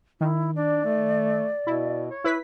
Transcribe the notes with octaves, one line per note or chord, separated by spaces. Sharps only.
D#3 E4
D4 D5
A3
B2 E4
C#5
E4 B4 B6